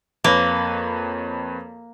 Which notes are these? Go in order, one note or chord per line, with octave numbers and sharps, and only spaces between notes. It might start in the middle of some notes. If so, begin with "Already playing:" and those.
F2 A#3 B4 C#5